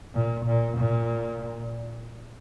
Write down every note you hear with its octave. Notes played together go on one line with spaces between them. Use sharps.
A#2
A#2
A#2